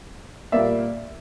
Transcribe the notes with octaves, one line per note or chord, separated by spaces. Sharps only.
A#2 G3 A#3 D5 E5